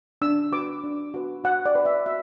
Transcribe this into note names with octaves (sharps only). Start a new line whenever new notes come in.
D4 E6
F#4 B4 D6
D4
F#4 B4
F#4 F#5
D5
B4
E5
F#4 E5